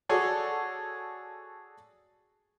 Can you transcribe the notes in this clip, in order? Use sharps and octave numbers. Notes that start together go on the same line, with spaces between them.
F#4 G#4 A4 C#5 D5